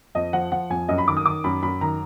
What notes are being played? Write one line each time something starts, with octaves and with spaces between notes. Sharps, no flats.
F2 D#5
F3 F#5
F3 F#5
F2 G#5
F#2 D#5
B5
D#3 D6
D#6
D#3 D6
F#2 B5
F#2 B5
D#3 A#5